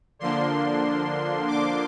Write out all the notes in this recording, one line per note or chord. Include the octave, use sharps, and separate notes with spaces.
D3 F3 A#3 D4 C6
D6